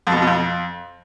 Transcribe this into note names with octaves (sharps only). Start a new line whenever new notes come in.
F2
B2
F2
B2
F2